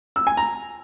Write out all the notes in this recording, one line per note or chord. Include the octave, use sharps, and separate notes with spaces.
E6
G#5
A#5